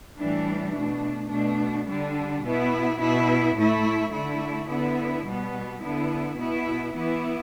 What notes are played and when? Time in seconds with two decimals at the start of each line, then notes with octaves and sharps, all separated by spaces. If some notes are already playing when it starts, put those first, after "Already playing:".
0.17 A2 E3 G3 D4
0.74 B2 A3 D4
1.30 B2 A3 D4
1.87 D3 G3 D4
2.43 B2 B3 E4
3.00 B2 B3 E4
3.56 A2 A3 E4
4.13 D3 A3 E4
4.68 D3 B3 E4
5.25 B2 G3 B3
5.81 D3 B3 E4
6.38 B2 B3 E4
6.94 E3 B3 E4